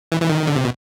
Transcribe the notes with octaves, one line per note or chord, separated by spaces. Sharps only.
E3
E3
D#3
D3
C3
B2